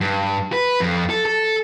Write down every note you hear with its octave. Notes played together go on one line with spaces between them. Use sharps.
G2
B4
F2
A4
A4